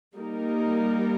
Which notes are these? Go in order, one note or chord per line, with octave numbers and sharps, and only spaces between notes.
G3 A#3 D#4 A#4